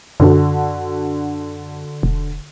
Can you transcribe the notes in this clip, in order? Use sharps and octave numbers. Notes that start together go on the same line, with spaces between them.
F#2 D3 F#4 A4
E1